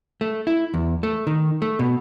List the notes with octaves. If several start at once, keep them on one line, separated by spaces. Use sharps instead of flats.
A3
E4
E2
A3
D#3
A3
B2